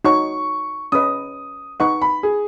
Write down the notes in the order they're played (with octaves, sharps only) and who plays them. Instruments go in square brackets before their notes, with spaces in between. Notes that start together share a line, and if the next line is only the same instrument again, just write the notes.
[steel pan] D#4 F#4 C#5 F#5 [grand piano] C#6
[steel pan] C#4 B4 D#5 [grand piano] D#6
[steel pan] D#4 B4 D#5 F#5 [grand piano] C#6
[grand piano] B5
G#4